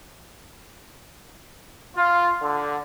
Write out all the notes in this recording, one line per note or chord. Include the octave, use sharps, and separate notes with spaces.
F4
D3